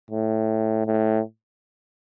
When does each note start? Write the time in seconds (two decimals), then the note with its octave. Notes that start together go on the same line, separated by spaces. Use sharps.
0.11 A2
0.86 A2